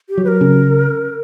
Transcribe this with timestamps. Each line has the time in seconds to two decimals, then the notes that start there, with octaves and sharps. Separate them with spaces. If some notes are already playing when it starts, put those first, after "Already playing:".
0.10 G4
0.18 F#3
0.24 B4
0.28 A#4
0.41 C#3